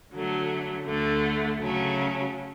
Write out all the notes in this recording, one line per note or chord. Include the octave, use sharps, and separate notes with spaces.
D3 F#3 A3
D2 D3 A3
C#3 F#3 A3 C#4